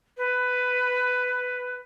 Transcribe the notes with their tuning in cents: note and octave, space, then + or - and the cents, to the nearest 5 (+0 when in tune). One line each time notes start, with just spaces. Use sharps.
B4 +10